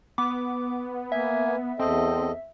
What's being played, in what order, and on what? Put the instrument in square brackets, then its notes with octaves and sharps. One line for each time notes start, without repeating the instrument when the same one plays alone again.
[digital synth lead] B3 [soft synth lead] D6
[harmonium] A#3 G#5 [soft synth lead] E5
[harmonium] E2 A4 D#5 [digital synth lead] C4